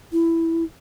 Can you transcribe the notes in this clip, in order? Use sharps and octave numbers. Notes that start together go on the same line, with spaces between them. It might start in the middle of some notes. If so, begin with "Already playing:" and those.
E4